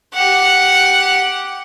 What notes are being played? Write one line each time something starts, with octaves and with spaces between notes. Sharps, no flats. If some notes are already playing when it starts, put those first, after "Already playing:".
G4 F#5